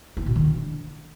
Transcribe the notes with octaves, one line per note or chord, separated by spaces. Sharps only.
E4
B2
D#3
D4